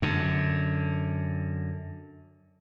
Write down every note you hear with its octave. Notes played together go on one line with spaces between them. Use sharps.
F#2 D3